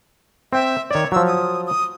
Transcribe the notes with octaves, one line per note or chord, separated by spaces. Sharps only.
C4 E5 G5
D#3 C#5 D5
F3 F#3 E6
D#6
D#6